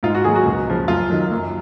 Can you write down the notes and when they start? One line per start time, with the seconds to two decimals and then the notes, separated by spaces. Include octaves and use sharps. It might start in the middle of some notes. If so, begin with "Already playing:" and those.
0.03 G#2 F4
0.15 F#4
0.24 D#3 F#3 G#4
0.36 F#4
0.45 C#2
0.67 C#3 F3
0.88 F#2 F4
1.10 D#3 F#3
1.31 F#2